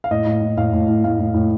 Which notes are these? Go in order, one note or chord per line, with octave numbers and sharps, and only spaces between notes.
F5
A2 D#5
A2
A2
A2 F5
A2
A2
A2 F5
A2
A2